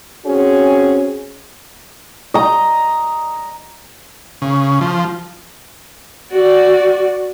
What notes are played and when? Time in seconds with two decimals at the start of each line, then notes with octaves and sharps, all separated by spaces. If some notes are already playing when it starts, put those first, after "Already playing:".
0.25 C4 C#4 F#4 G#4
2.34 D#5 A#5
4.42 C#3
4.81 F3
6.32 F#4 D5